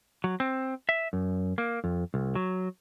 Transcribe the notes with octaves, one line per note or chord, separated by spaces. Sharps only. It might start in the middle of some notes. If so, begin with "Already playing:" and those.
F#3
C4
E5
F#2
A#3
F2
C2
F#3